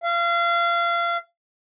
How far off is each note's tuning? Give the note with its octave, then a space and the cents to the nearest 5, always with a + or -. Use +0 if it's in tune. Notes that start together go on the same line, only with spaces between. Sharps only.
F5 -30